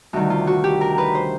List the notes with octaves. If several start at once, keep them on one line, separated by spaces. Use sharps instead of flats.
D2 C3 D#3 G3 F#4
F4
F#4
G4
A#4
B4
C5